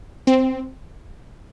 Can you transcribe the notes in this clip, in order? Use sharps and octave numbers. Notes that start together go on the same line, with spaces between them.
C4